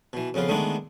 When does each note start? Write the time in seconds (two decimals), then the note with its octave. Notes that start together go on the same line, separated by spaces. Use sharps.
0.13 B2 E3
0.34 F2 C#3 B3 F4
0.49 D3 D#3 G#3 A3 B3 D4